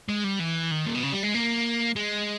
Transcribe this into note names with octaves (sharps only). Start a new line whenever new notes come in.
G#3
G3
E3
D#3
A#2
B2
C#3
G3
G#3
A#3
G#3